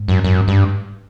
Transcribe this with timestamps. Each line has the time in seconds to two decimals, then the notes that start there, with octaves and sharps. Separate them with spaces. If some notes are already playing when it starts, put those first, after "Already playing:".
Already playing: G#2
0.08 F#2
0.24 F#2
0.48 G2